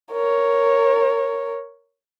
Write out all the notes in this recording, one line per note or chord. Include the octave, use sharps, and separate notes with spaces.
A#4 C#5